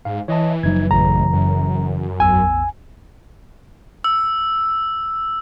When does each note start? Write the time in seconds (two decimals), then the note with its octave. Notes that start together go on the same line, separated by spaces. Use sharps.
0.05 G#2 F5
0.28 E3 C#5 D#5 A5
0.63 F#1 F3 F#3 D#4 G#6
0.91 A1 C#3 E3 A#5
1.33 F#2
2.20 A1 E2 G#5 E6
4.04 E6